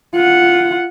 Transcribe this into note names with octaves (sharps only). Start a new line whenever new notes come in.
F4 F#5